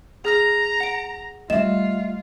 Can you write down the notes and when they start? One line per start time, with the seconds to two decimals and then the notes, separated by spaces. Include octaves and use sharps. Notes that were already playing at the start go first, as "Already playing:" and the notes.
0.25 G#4 A#5 F6 A#6
0.80 F#5 D7
1.50 G3 A3 F4 D#5 E5 E7